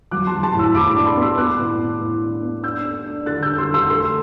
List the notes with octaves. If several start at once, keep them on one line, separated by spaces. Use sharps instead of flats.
F#3 D6 F#6
A5 C6
F#3
A5 C6
A2
C6 E6
A2 B5 D6
B5 D6
D4
A5 C6
B3
C6 E6
B3 D6 F#6
A2
B3
A2
D4
B3
D4 E6 G6
A3
D4
D3 F#6 A6
E6 G6
D3
C6 E6
D3
C6 E6
A3 C6 E6